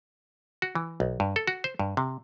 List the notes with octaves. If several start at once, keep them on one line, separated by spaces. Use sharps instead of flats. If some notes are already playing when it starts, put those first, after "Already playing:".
F#4
E3
B1
G2
A4
F#4
C5
G2
C3